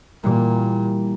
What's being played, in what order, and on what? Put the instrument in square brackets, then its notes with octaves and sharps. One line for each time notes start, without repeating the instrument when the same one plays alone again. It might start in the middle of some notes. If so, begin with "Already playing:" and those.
[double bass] A#2 [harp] E3 G3 A#3